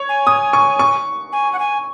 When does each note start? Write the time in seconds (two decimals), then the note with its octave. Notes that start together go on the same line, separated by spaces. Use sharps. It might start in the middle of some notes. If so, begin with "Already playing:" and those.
Already playing: C#5
0.09 G#5
0.27 D#6
0.53 C#6
0.79 C#6
1.32 G#5
1.53 F#5
1.59 G#5